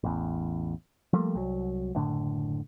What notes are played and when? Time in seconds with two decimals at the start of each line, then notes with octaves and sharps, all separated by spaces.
0.04 A1 E2
1.13 F3 G3 A3 A#3
1.35 C2 F#3
1.95 F#1 A2 D3